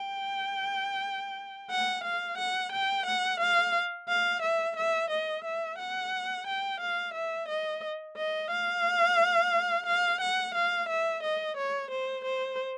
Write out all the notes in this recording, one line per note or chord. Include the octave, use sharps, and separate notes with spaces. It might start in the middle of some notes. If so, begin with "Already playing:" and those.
Already playing: G5
F#5
F5
F#5
G5
F#5
F5
F5
E5
E5
D#5
E5
F#5
G5
F5
E5
D#5
D#5
F5
F5
F#5
F5
E5
D#5
C#5
C5
C5